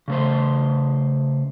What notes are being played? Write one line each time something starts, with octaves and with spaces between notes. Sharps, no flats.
C#3 A3 C5